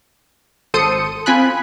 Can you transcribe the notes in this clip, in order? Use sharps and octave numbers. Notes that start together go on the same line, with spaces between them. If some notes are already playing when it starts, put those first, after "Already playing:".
G#1 A4 C5 D#6 C#7 D#7
C4 F4 G#5 B5 F#6